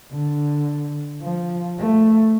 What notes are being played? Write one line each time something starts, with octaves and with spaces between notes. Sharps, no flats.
D3
F3
A3